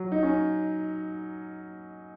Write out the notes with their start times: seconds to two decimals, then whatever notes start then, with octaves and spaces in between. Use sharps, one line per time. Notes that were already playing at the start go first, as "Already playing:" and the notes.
Already playing: F#3
0.12 D#4
0.23 C#4